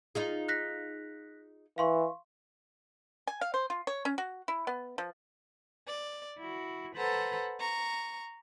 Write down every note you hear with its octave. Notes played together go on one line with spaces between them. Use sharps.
D#4 F4 G#4
F#6 A#6 B6
E3 F5 C6 C#6
G#5
F5
C5
F4
C#5
C#4
F#4
E4
B3
F3
D5
E4 F#4
A4 B4 C5 F#5 A#5
A#5 C#6